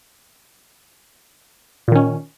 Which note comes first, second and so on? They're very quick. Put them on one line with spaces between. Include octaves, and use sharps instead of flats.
A#2 D#3 C#4